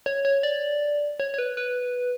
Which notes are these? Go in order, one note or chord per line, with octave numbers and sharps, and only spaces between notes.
C#5
C#5
D5
C#5
C#5
B4
B4